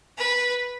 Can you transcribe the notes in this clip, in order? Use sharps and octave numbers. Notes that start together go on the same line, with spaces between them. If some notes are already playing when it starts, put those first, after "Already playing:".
B4